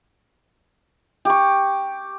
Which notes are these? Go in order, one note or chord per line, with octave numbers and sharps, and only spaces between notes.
G4 C#6